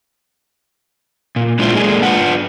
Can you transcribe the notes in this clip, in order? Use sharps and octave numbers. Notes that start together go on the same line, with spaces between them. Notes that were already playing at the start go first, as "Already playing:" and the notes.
A#2
G#3 B3 D4 E4 F4 C5
G#3 A#3 D4 G#4
D4 F4 B4 F#5